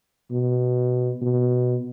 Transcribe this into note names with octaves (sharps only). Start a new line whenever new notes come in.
B2
B2